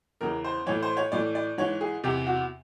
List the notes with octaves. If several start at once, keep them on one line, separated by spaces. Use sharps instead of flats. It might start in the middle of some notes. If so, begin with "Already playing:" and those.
E2 C#3 E3 A#4
C5
A2 E3 C#5
C5
C#5
A2 E3 D5
D5
G#2 E3 C#5
G#4
E2 C3 E3 G4
F#4